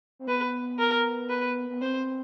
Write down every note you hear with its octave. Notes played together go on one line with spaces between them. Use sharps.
C4
B3 B4
A#4
B4
B3
C4 C5